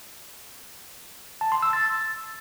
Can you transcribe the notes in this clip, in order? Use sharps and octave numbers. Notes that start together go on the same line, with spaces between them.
A5
C6
E6
A6